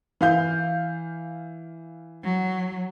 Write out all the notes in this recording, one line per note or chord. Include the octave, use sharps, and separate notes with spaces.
E3 F5 G6
F#3